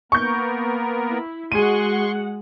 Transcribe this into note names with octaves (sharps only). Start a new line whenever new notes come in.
A#3 B3 A#4 C#6 G6
E4
G#3 F#4 G#4 F#5 C6 C#6 D#7